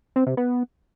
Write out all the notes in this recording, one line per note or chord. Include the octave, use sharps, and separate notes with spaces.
C4
C3
B3